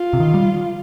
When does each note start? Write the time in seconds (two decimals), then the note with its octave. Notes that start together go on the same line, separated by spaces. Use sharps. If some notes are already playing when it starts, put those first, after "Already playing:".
Already playing: F4
0.13 C3
0.20 D#3
0.34 G3